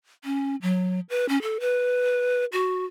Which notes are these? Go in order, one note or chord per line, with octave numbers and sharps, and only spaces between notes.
C#4
F#3
B4
C#4
A4
B4
F#4